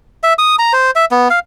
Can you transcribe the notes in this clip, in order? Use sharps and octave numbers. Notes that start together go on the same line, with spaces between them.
E5
D#6
A#5
C5
E5
B3
F5